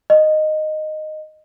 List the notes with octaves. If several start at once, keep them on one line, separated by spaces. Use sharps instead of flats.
D#5